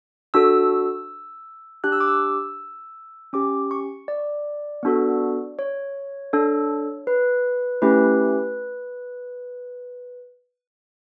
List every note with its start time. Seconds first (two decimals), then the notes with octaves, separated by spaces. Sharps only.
0.34 D4 F#4 A4 E6
1.84 D4 G4 F#6
1.92 E6
2.00 D6
2.08 E6
3.33 C#4 G4 D6
3.71 C#6
4.08 D5
4.83 B3 D4 F#4 A4
5.59 C#5
6.33 D4 A4
7.07 B4
7.82 A3 C#4 E4 G4 B4